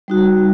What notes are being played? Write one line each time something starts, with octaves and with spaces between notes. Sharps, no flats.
G3 D#4 F#4